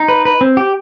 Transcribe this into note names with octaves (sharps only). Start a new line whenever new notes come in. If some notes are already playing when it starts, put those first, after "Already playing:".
Already playing: D#4
B4
B4
C4
G4